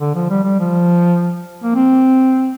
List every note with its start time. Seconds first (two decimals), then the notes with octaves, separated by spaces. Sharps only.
0.01 D3
0.15 F3
0.30 G3
0.44 G3
0.59 F3
1.63 A#3
1.75 C4